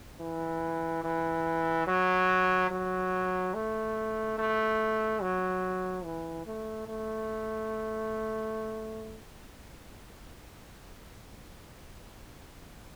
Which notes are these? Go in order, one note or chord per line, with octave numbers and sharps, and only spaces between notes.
E3
E3
F#3
F#3
A3
A3
F#3
E3
A3
A3